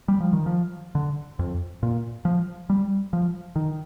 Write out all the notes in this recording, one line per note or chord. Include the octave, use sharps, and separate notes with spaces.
G3
F3
D#3
F3
D3
F2
A#2
F3
G3
F3
D#3